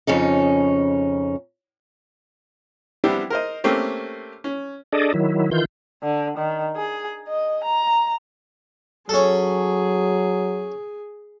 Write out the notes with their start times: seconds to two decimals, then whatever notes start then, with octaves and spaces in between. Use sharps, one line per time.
0.07 F2 C#3 C#4 D#4
3.04 G3 B3 C4 D4 E4 G4
3.30 A#4 C5 D#5
3.64 A3 A#3 C4 C#4 G4
4.44 C#4
4.93 D4 G#4 A4 D5 D#5
5.14 D#3 F#3 E4
5.51 D#3 E3 F4 G6
6.03 D3
6.38 D#3
6.76 G#4
7.28 D#5
7.65 A#5
9.09 F#3 C#4 G#4 A4